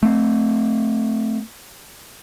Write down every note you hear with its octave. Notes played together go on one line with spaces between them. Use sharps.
A3 C4